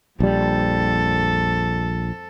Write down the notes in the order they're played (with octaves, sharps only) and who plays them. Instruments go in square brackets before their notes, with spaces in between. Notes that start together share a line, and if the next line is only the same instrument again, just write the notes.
[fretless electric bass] A#1 G3 [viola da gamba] F2 A4